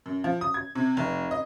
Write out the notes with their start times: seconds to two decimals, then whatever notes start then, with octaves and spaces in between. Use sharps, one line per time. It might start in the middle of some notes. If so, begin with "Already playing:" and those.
0.06 F#2
0.24 F3
0.41 D#6
0.54 G#6
0.75 C3
0.97 F1
1.31 D#5